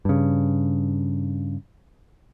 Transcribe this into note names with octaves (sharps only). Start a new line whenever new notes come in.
G2 C#3